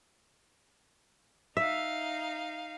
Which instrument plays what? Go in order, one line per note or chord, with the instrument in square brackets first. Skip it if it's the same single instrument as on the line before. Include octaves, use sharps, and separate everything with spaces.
[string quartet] D#4 F5 [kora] E5